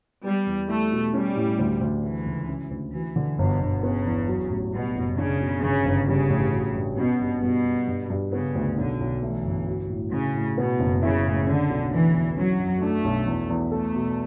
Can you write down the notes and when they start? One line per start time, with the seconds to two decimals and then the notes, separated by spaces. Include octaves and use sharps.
0.24 G3 B3
0.46 E2
0.68 A3 E4
0.91 B2
1.14 G3 C#4
1.36 A2
1.59 D2
1.81 D2
2.04 E3 A3
2.26 C#2
2.48 C#4
2.71 D2
2.93 E3 F#4
3.16 D3
3.39 G1 B2
3.61 G1
3.83 C#3 B3
4.06 E2
4.28 F#3
4.50 A1
4.73 B2 G3
4.96 F#1
5.18 C#3 D4
5.40 B2
5.63 G1 C#3
5.85 G1
6.07 C#3 G3
6.30 A1
6.53 F#4
6.75 G2
6.98 B2 C#4
7.20 G2
7.42 G2 B2
7.65 G2
7.88 G2
8.10 G2
8.32 C#3 B3
8.55 D2
8.77 B1 D3
9.00 B1
9.22 E3 A3
9.45 G1
9.68 F#4
9.90 A2
10.12 A2 C#3
10.35 A2
10.57 B2 B3
10.80 F#1
11.02 C#3 E4
11.24 A2
11.47 D3 C#4
11.70 B1
11.92 E3 A3
12.14 E2
12.37 F#3 C#4
12.59 F#2
12.82 A3 D4
13.04 B1
13.27 E2
13.49 E2
13.72 A3 A4
13.94 B2